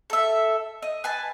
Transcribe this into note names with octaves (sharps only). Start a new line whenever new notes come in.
A4 E5
D#5
B4 G#5 A5